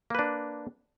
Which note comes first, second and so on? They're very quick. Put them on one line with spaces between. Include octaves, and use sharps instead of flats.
A#3 B4 D4